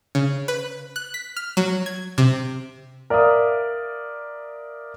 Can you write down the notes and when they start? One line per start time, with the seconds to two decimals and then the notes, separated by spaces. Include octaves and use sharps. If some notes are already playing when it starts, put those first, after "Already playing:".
0.15 C#3
0.48 B4
0.96 F#6
1.14 B6
1.36 F6
1.57 F#3
1.86 G#6
2.18 C3
3.10 A#4 D5 E5 F5 D#6